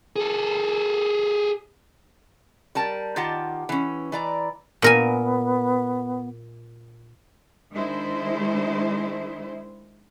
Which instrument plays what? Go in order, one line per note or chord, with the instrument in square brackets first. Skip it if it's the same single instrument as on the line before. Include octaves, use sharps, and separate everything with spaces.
[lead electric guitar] G#4 A4
[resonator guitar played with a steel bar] G3 A#4 A5
D#3 F4 G4 F#5 A5
E3 C#4
E3 D5 A#5
[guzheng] A#2 A#4 G#5 [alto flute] B3
[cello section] D#3 G#3 D4 E4 C5